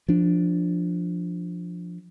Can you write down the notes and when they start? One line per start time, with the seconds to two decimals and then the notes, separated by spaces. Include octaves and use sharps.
0.08 F3 D4